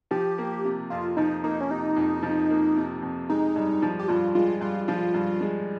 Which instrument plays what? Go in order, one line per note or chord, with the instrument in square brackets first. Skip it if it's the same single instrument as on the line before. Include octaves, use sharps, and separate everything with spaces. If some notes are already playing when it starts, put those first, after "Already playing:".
[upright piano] F3 [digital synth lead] G4
[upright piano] A#3
C3
[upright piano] F2 [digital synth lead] F4
[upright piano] F3 [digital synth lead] D#4
[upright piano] A#3 [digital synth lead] D#4
[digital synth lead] C#4
[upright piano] C3 [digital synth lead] D#4
[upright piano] F2
F3
A#3
C3
F2
[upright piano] G#3 [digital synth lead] D#4
[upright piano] G2
F3
[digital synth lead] G4
[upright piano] G2 [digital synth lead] F4
[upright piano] G#3 [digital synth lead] F4
[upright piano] G2 [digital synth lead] F4
[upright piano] F3 [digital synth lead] F4
[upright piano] G2
G#3